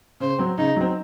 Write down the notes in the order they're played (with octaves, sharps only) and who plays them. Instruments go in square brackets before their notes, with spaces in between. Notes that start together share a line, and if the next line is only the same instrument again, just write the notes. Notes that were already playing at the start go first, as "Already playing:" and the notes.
[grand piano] C#3 [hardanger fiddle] C5
[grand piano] F#3 C4
[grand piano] C#3 [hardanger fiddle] D#4
[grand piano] F#3 C4